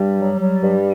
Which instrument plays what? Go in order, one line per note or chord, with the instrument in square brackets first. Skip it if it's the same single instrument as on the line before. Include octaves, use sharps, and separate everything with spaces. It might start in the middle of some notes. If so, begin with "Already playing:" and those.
Already playing: [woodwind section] G2 [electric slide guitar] G3
[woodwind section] F#3
F#3
G2